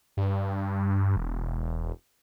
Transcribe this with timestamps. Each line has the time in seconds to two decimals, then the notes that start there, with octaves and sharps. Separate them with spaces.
0.17 G2
1.16 E1